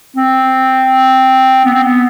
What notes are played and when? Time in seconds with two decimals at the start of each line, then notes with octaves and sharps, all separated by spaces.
0.17 C4
1.65 B3
1.74 C4
1.83 B3